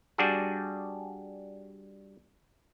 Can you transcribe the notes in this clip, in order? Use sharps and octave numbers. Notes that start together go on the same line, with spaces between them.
G3 D4 F#4 G#4